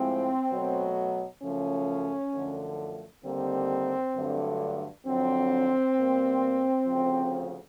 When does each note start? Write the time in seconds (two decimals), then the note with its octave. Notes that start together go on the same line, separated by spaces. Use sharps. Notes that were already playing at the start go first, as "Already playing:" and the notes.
Already playing: A2 F3 G#3 C4
0.52 B2 F#3 A3
1.43 F#2 C#3 F3 A3 C#4
2.33 F#2 D3 F3 A3
3.24 D#2 D3 G3 A#3 C4
4.14 G2 D3 F#3 A3
5.05 F2 D3 F#3 C4
5.96 B2 G3 A#3
6.87 D2 C#3 F3